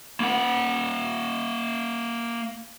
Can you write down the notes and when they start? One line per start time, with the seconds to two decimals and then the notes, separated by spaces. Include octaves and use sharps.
0.20 A#3 F#5